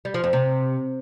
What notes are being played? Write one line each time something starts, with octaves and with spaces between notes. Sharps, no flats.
G3
F3
F2
C3